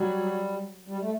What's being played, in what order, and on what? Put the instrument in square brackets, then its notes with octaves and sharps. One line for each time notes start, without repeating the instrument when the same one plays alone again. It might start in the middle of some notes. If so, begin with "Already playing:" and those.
Already playing: [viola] F#3 [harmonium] G3
[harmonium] G3
A3